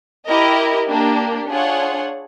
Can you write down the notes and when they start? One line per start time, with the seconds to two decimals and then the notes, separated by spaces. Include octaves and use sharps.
0.27 E4 G4 A#4 D#5
0.89 A#3 D4 G4
1.50 D4 F4 G#4 C#5 F#5